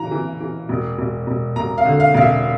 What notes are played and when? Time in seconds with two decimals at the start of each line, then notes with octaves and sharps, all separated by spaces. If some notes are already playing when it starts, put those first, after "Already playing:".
Already playing: E3 A#5
0.11 E3
0.40 E3
0.69 E1
0.99 E1
1.27 E1
1.56 E1 A#5
1.78 F5
1.85 D3
2.00 F5
2.15 E1 F5
2.21 E5